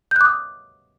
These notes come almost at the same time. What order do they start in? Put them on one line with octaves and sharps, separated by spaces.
G6 F#6 D6 D#6